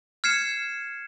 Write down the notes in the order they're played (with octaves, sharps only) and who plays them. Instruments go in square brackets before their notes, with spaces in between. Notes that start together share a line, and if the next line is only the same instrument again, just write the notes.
[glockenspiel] F6 G#6 C7 C#7 E7